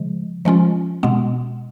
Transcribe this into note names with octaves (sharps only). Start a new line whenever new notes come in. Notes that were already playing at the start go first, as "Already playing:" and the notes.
Already playing: C#3 F3 G#3
F3 G#3 C#4 F4
B2 G#3 B3